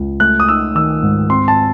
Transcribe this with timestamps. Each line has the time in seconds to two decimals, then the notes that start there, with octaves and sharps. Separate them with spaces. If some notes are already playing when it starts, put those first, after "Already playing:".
Already playing: C#2
0.20 A3 F#6
0.40 D#6
0.48 D#4 E6
0.75 D#3 E6
1.02 G#2
1.29 C4 C6
1.48 A5